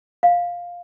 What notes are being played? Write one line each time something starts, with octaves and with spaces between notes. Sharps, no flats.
F5